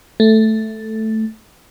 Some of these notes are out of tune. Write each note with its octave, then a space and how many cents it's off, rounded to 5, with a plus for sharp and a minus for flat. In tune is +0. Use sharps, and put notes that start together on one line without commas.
A3 +0